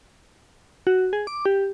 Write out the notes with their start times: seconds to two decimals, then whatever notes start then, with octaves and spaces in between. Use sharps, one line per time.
0.87 F#4
1.13 G#4
1.27 D6
1.46 G4